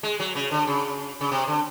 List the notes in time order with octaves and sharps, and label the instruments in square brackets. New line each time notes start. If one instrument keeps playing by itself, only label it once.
[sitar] G#3
F#3
C#3
D3
C#3
C#3
C3
D3